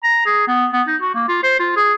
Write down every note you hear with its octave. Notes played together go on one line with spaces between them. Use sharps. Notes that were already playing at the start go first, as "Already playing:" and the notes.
A#5
G#4
B3
B3
D#4
F#4
A#3
F4
C5
F4
G#4